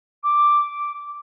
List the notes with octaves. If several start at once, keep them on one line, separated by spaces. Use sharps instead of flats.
D6